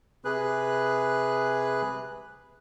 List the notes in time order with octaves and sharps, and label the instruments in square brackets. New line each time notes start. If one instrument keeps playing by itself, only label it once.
[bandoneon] C3 G#4 B4 F#6